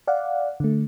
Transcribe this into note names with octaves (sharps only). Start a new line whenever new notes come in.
D5 F5 F#5
D3 A3